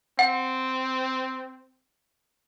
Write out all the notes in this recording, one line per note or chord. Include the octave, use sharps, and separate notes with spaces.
C4 F#5